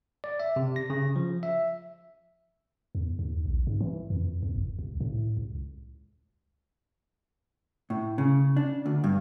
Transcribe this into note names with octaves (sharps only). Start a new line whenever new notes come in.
D5
E5
C3
A#6
C#3
F3
E5
E2
D#2
A#1
G#2
E3
F2
E2
F1
C#2
A2
C#2
A2
C#3
D4
D2
G2